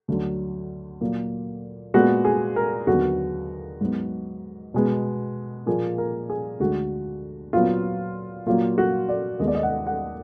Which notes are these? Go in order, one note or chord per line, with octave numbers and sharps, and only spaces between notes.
D2 D3 F#3
A#2 F#3 A#3
A#2 G#3 B3 F#4
G#4
A#4
D#2 D3 F#3 B3 F#4
G#2 F#3 B3
B2 G#3 B3
A#2 F3 A#3 G#4
A#4
G#4
D2 D3 G#3 F#4
A#2 F#3 B3 F4
A#2 F#3 A#3 F4
F#4
D5
D#2 D#3 G#3 B3 D#5
D5
D#5
F#5
F#5